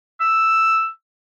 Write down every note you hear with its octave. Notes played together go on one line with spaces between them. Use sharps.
E6